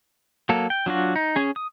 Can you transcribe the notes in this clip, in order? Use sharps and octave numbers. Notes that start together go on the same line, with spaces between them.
F#3 A#3 A4
G5
F#3 D4 F4 F#4
D#4
C#4 G#4
D#6